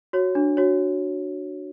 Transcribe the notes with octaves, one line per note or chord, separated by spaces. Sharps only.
F#4 C#5
D4
F#4 C#5